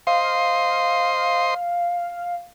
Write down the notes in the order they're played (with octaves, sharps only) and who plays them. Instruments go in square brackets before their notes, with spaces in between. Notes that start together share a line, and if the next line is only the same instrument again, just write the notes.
[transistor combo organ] C5 D#5 C6 [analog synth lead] F5